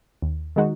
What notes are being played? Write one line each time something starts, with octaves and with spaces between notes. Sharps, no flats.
D#2
D#3 G#3 D#4 F#4